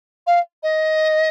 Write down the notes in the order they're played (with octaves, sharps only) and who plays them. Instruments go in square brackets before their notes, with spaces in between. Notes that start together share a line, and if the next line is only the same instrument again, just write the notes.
[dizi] F5
D#5